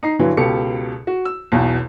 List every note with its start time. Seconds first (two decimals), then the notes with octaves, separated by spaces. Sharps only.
0.03 D#4 A#5 C7
0.19 G2 D3 E3 F#3
0.37 C#2 B2 G4 A4 C#7
1.07 F#4
1.25 E6
1.52 B1 E2 B2